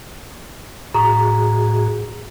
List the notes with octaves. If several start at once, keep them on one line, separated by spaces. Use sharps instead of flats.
A2 F#4 G#4 A#5